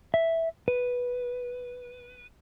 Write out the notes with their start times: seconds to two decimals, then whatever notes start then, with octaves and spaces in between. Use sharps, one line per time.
0.14 E5
0.68 B4